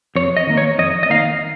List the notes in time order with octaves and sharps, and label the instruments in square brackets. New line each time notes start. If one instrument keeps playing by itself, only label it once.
[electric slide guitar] F2 C#5
D#5
D#3 A#3
C#5
F2 D#5
D#5
D#3 A#3 F5